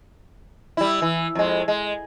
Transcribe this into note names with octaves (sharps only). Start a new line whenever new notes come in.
G3 E4
E3
F2 G#3
G#3